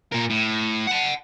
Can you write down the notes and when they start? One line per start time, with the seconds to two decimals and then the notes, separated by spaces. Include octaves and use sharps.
0.12 A#2 A#4
0.30 A2
0.87 F#5 A5